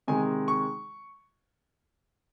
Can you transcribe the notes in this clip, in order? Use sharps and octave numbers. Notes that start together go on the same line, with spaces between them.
C3 D#3 G#3 G#5
C#6